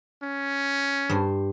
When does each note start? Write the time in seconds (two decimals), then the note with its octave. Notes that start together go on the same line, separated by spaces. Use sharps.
0.23 C#4
1.10 G2 C5